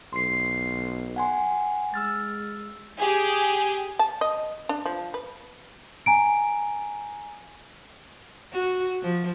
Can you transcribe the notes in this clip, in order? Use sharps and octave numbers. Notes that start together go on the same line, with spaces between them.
B1 C6 C7
F#5 G#5 C6
G#3 E6 F6 A6
G4 G#4
A5
D#5
D4
F3
B4
G#5 A#5 D7
F#4
F3